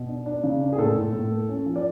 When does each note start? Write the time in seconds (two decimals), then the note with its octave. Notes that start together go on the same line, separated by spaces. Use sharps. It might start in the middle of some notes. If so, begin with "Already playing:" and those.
Already playing: B2
0.08 D4
0.26 D4
0.44 C#3
0.61 D4
0.73 G#4
0.78 A2 A4
0.96 A2
1.13 A2
1.31 A3
1.49 C#4
1.66 F3
1.76 D5